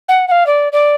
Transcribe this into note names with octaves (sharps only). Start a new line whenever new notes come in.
F#5
F#5
F5
D5
D5